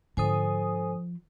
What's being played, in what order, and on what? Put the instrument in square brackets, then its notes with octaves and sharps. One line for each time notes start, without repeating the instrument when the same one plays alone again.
[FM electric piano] G#2 D3 D#6 [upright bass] F3 [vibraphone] A4 C5 G#5